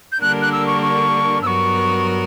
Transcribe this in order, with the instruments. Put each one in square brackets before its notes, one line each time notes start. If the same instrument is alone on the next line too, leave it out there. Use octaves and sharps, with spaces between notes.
[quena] G6
[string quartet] D3 G3 A#3 D4 A#4 [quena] F#6
[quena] F#6
E6
C#6
C#6
[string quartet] G2 F#3 B3 F#4 A#4 [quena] C#6 E6